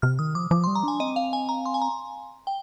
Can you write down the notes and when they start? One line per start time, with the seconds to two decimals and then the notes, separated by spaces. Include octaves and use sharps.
0.02 C3 F6
0.19 D#3 D#6
0.35 F3 D6
0.51 F3 D6
0.64 C6
0.67 G3
0.75 A#5
0.83 D4 G#5
1.00 C4 D#5
1.16 F5
1.33 G#5
1.49 A#5
1.66 C6
1.74 G#5
1.82 A#5
2.47 G5